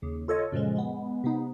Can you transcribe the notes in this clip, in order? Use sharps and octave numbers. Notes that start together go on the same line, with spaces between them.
D#2 C#3
F4 A4 C#5 D#5
F#2 A#2 C#3 F3 G#3
G#3 B3
C3 B3 D#4